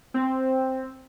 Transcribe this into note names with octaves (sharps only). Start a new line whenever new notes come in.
C4